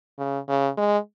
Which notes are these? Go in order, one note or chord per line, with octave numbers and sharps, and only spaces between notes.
C#3
C#3
G#3